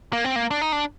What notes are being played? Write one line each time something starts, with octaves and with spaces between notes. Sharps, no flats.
A#3
C4
A#3
D4
D#4
D4